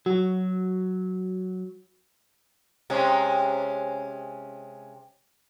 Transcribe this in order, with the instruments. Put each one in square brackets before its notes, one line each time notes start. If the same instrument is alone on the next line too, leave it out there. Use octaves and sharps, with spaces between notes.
[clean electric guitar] F#3 [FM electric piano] F#4
[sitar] C3 G#3 C#4